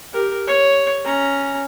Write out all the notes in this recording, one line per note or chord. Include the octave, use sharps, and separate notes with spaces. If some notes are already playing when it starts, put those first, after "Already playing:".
G4 A#4
C#5
C#4 A#5